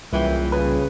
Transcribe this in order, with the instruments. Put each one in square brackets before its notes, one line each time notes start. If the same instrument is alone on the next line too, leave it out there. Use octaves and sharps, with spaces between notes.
[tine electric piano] C2 [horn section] F#2 C#3 E3 [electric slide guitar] A#2 G3 G5
[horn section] C#3 [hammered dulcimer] B4